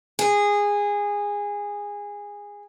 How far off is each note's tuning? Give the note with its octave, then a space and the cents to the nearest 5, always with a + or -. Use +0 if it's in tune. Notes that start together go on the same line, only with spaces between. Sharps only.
G#4 -20